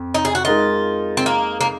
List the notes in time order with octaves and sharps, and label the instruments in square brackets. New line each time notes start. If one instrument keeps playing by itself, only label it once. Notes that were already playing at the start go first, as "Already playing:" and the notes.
Already playing: [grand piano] F2
[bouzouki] D#4
G#4
F#4
[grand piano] G#3 D#4 A#4 D#5 [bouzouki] F4
[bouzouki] C4
A#3
A#3